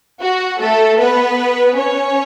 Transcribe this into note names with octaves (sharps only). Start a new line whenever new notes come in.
F#4
A3 A4
B3 B4
C#4 C#5